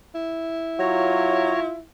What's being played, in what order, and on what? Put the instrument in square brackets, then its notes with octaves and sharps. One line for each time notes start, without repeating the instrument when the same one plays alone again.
[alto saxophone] E4
[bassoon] F#3 [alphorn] F4 [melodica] C#5 A#5